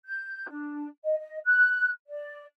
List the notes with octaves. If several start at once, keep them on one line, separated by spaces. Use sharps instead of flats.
G6
D4
D#5
D#5
F#6
D5